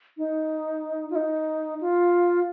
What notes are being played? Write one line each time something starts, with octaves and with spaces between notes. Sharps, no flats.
D#4
F4
D#4
F4